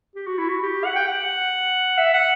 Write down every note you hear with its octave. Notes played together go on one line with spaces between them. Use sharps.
G4
F#4
E4
F#4
G4
F#5
G5
F#5
E5
F#5